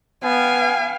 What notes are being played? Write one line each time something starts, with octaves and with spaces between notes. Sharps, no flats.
B3 F5 G5 G#5